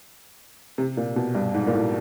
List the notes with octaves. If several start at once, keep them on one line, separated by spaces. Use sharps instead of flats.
C3
A#2
B2
G2
G#2
A#2
A2